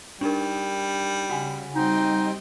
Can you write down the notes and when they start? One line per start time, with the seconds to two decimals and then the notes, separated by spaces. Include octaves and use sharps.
0.21 G3 D4 D#4 A#4
1.30 C#3 F#4 F#5 G#5
1.75 G3 C4 D#4 D#5 G5